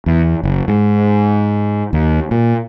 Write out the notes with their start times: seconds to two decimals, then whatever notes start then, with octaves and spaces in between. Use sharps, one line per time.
0.06 E2
0.43 F#1
0.68 G#2
1.93 D#2
2.31 A#2